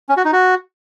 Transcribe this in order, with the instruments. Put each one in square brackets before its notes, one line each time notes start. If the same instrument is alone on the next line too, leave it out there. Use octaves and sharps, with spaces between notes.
[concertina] C#4
F#4
D#4
F#4